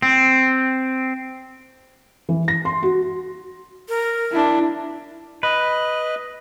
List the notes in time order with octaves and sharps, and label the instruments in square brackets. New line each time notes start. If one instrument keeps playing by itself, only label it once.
[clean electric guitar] C4
[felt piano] E3
A#6
C6
F#4
[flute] A#4
[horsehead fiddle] D4 E4
[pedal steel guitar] B4 [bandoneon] D#5